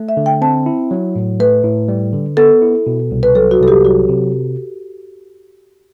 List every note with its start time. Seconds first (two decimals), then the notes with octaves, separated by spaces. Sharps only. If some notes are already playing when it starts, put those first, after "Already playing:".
Already playing: A3
0.09 E5
0.17 D3
0.26 G5
0.42 C4 A5
0.66 E4
0.91 F#3
1.16 A2
1.40 A3 B4
1.64 A2
1.88 G3
2.13 D3
2.37 B3 A4
2.62 E4
2.87 B2
3.11 C2
3.23 B4
3.35 F#3 A4
3.51 F#4
3.60 C2 A4
3.68 G4
3.84 F#3 F#4
4.09 C3